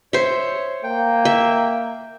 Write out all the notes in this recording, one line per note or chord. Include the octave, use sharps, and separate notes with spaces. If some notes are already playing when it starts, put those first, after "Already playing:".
C5 C#5 E5
A#3 G5
E5